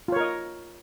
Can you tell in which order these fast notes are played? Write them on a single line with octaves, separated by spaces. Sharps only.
F4 C#5 A#4 D#5